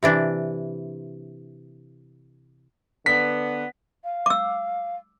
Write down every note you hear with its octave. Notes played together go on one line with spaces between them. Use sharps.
C3 E3 D4
D3 B3 B6
F5
D6 E6